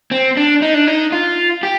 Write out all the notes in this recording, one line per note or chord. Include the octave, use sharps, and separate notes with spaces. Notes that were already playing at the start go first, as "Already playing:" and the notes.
C4
D4
D#4
D4
D#4
F4
G4